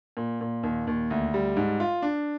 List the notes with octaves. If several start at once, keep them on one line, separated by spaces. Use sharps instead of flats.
A#2
A#2
D#2
D#2
D2
G3
G#2
F4
D4